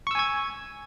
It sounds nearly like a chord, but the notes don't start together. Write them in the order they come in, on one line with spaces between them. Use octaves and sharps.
C#6 E6 G#5 G#6